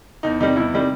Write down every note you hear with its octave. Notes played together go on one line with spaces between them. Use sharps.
E2 D#4
C3 D#3 G3 D#4
E2 E4
C3 D#3 G3